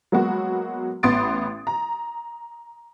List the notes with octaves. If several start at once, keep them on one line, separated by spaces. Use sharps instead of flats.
F#3 G#3 A#3 B3 F#4
A1 B3 C6 D#6 A6 D7
A#5